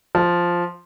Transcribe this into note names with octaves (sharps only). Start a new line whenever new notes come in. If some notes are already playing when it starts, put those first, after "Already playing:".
F3